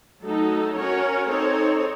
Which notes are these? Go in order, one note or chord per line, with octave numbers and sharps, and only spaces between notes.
F#3 A3 D#4 A4
C#4 F#4 A#4 C#5
C4 D#4 A4 C#5